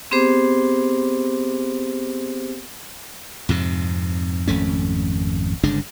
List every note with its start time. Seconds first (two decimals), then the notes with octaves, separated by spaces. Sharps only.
0.11 B3 C4 G4 G#4 C5 D6
3.49 F2 G#2 C3
4.48 G#1 F2 A3 C#4
5.63 G1 C#3 G#3 D4